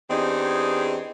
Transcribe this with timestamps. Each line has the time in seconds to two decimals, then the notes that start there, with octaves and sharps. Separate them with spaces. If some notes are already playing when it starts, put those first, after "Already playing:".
0.09 E2 C4 D4 D#4 G4 G#4